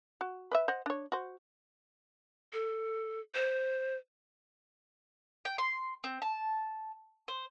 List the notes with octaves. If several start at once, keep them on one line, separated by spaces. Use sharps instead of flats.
F#4
B4 D#5 E5
C5 D#5 F#5
D4 C#5
F#4 C5
A4
C5
G5
C6
C4
A5
C5